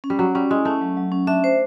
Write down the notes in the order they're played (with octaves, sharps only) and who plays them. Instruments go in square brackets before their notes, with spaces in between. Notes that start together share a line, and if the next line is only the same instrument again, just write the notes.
[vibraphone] C#4
[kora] G3
[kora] F#3 [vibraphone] C#4
[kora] G3 [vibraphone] C#4
[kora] G#3 [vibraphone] E4
[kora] A3 [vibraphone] C#4
[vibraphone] F#3
F#3
C#4
[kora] D4 [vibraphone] E5
[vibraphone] C5